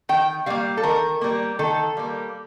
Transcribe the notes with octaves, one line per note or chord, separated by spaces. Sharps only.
D#3 G5
G3 A#3 F5
A4
D#3 A#4
G3 A#3
D#3 A4
G3 A#3